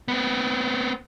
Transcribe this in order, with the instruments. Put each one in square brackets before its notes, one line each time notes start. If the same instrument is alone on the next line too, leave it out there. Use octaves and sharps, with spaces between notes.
[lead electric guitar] B3 C4